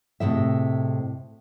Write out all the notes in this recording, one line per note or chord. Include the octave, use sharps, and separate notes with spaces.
A2 C3 G#3 E5